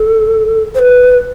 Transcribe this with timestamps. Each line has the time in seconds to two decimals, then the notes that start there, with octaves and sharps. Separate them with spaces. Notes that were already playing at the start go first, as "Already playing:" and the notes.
Already playing: A4
0.75 C5
0.79 B4